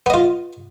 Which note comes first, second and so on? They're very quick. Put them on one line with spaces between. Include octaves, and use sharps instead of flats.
B3 D#5 F4